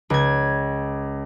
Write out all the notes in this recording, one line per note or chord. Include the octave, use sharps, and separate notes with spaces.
C#2 G#6